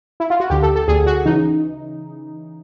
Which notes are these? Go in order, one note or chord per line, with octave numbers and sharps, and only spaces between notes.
E4
F4
F#4
D2 D3 G4
A4
A4
D2 D3 G#4
F#4
C#3 E3 D#4